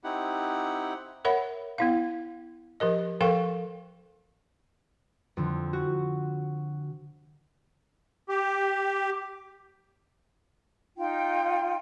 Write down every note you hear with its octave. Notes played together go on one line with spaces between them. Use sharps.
C4 D#4 E4 G4 F#5
A#4 C#5 E5 F#5 B5
B3 E4 F5
F3 G4 A#4 D#5
F3 A4 A#4 F5 G5 C#6
F2 D3
F#4
G4
D#4 F4 G5